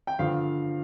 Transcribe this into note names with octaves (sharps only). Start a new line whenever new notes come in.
G5
G2 D3 F3 F5